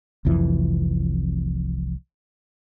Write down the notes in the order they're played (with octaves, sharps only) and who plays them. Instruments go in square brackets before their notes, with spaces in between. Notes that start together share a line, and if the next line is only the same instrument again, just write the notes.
[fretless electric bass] F1 C2 F2 E3